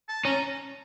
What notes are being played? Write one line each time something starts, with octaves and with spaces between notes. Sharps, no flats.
A5
C#4 A#5